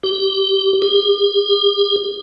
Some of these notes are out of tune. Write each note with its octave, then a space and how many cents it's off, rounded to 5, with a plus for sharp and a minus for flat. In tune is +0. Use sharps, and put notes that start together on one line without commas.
G4 -20
G4 +45